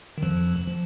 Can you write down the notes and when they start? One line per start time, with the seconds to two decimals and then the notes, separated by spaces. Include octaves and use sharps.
0.18 D#3
0.22 F2 F3
0.67 F3